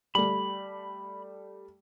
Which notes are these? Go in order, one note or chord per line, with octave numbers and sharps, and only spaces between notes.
G3 A3 B5